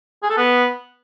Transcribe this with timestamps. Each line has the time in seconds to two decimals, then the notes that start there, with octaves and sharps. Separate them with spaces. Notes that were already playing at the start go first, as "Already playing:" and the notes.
0.23 G#4
0.30 A4
0.37 B3